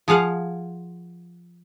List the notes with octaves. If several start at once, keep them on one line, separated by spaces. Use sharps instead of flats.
F3 G#4 F5 F#5